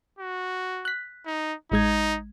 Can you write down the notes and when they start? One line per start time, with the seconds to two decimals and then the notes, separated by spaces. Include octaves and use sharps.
0.19 F#4
0.85 F#6 B6
1.26 D#4
1.72 A1 G#3 D#4 G#6